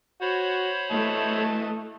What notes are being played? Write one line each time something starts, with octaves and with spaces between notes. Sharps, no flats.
F#4 C5 C#5 B5
E3 A3 D#5 A5